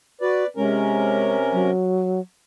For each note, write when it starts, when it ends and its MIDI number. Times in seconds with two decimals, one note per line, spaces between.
0.21 0.44 66
0.21 0.47 71
0.21 0.47 74
0.57 1.71 48
0.57 1.36 56
0.57 1.71 61
0.57 1.71 70
1.53 2.20 54